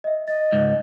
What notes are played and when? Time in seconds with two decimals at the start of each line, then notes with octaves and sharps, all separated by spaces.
0.04 D#5 E5
0.28 D#5 A6
0.52 C#2 G#2